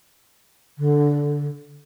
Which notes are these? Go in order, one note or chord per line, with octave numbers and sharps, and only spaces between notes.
D3